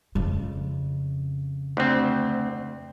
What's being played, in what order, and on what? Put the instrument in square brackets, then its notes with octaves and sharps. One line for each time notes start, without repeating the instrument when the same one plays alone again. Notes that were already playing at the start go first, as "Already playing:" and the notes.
[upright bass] F2 C#3
[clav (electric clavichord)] D2 C4